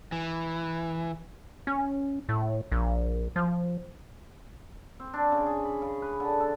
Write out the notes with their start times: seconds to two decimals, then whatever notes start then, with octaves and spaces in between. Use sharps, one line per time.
0.12 E3
1.67 C#4
2.29 A2
2.72 A#1
3.36 F3
5.00 C4
5.13 D4
5.32 C#3
5.46 G#4
5.65 B5
5.82 C#3
6.02 B4
6.20 D3
6.40 A4